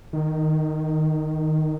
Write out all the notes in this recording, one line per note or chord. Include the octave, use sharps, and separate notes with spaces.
D#3